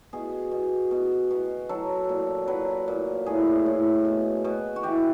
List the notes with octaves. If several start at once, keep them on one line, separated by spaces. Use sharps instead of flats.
B2 G#4
B2
B2
B2
F#3 A4
A#2
F#3 B4
A#2
A2 G#4
A2
B2
B2
F#4
E3 G4